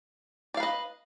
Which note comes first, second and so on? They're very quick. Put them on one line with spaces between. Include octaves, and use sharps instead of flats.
D5 F5 B4 D#5